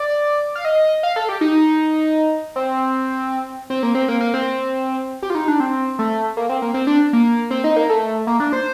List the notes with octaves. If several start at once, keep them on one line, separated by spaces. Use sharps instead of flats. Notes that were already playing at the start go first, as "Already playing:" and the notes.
Already playing: D5
F5
D#5
F5
A4
G4
D#4
C4
C4
A#3
C4
A#3
A#3
C4
G4
F4
D#4
D4
C4
A3
A#3
C4
A#3
C4
D4
A#3
C4
D#4
A#3
A3
A#3
D4
C5